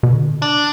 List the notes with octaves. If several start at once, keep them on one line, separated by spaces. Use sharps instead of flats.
B2
D3
D4